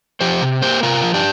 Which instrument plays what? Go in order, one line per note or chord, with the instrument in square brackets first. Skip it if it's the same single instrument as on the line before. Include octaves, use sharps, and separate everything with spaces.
[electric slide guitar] F3 G4 C5
C3
A#3 G4 C5
C3 F4 A#4
F3
D4 G4